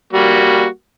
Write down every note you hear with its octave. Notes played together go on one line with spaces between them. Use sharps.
G3 A#3 F#4